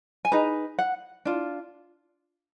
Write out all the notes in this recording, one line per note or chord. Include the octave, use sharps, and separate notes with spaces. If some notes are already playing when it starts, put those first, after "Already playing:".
G#5
D#4 G#4 B4 A#5
F#5
D4 F4